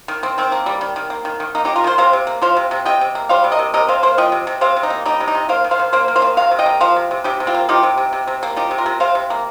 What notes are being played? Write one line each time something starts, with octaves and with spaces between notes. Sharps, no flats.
D#3
D#3 C4
D#3 C4
A#3
G3
D#3
D#3
A#3
D#3
D#3
A#3 D#4
A#3 D#4 G4
F4 A#4
D#3 G4 C5
C3 C5 F5
C3
A#3
F3 C5 F5
C3
C3
C3 D#5 G5
C3
A#3
G3 C5 F5
C3
A#4 D#5
C3
C3 A#4 D#5
C3 C5 F5
A#3 C5 F5
F3 D#5 G5
C3
C3
C3 C5 F5
C3
D#4
A#3
G3 D#4
C3
D#4
C3
A#3 C5 F5
D#3
C5 F5
D#3
A#3 C5 F5
A#3
C5 F5
D#3
C3 C5 F5
C3
D#5 G5
A#3
F3 C5 F5
C3
C3
C3 D#4 G4
C3
C4 F4
A#3
F3 D#4 G4
C3
C3
C3
C3
A#3
F3 D#4 G4
C3
F4 A#4
C3
C3 C5 F5
C3
A#3